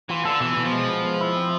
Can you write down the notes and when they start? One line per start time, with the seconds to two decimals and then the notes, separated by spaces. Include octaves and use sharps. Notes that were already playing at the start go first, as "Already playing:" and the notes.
0.09 E3 F4
0.25 D3 A4
0.40 B2 E3
0.57 B2
0.65 F3
0.72 G#3
0.89 B3
1.05 G#3
1.21 E4
1.37 C4